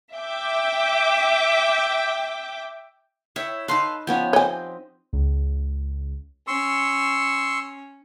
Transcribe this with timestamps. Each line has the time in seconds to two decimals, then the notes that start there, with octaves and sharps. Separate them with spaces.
0.15 E5 G5 D6
3.36 E4 C#5 G5
3.68 D#4 A4 B4 F5 C6
4.07 F3 B3 C#4 G4
4.33 C4 C#5 D#5 G#5
5.13 C#2
6.47 C#4 C6 C#6 E6